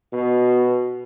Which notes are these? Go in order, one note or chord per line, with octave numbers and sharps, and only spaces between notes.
B2